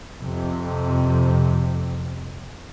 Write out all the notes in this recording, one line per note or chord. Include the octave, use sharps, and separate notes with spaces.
F2 C3